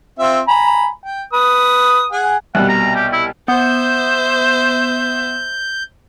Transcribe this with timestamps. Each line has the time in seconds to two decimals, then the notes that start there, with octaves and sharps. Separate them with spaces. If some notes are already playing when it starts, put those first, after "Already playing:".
0.19 C4 F4 E5
0.48 G#5 A#5 B5
1.04 G5
1.33 B4 D#6
2.12 G#4 F#5 G#5
2.55 C2 B2 G3 F#5
2.69 A#5
2.95 G4
3.13 E4
3.48 B3 C5 E5 G6